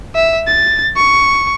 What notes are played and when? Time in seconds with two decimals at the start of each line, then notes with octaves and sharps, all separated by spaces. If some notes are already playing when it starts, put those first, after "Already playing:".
0.15 E5
0.48 A6
0.96 C#6